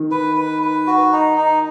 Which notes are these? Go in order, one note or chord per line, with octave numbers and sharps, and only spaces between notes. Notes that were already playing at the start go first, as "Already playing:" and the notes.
Already playing: D#3
B4
B4
B4
F#4
D#4
D#4